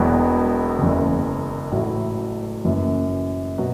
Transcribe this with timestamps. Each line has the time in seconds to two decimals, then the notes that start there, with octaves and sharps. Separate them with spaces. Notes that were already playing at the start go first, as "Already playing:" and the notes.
Already playing: E1 E2 B2 F#3 B3
0.79 F#1 E2 C#3
1.71 A1 A2 F#3 A3 E4
2.65 F#1 F#2 E3
3.58 B2 F#3